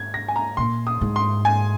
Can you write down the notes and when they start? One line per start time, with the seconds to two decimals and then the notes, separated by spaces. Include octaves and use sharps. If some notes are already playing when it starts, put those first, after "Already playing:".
Already playing: G#2 G#6
0.14 A#6
0.28 G#5
0.36 A#5
0.57 A#2 C6
0.87 D#6
1.01 G#2
1.16 C6
1.45 G#5